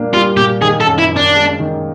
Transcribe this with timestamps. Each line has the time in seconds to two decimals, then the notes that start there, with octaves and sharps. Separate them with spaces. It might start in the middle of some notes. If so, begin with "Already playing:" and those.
Already playing: A#2 G3 A#3 D4
0.13 G3 F4
0.37 A#2 G4
0.62 D#3 G#4
0.81 A4
0.86 F#2
0.99 E4
1.11 F#2
1.17 D4
1.36 G#3
1.60 D#3